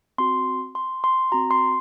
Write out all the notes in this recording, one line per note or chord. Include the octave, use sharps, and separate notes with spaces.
C4 F#4 C6
C6
C6
C4 F#4 A#5
C6